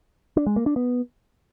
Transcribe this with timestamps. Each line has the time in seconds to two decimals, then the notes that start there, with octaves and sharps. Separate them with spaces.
0.37 D4
0.46 G#3
0.56 A#3
0.66 D4
0.76 B3